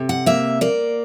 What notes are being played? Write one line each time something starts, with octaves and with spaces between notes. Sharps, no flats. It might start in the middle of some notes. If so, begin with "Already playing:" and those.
Already playing: C3
F#5
A#3 E5
A#3 D5